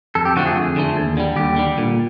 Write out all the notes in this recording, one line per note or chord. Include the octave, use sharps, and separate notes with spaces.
F2 A4
G4
D3 F3 A3 F#4
G#4
F2
D3 F3 A3
D#2
D3 G3
D#2 G4
D3 G3
A#2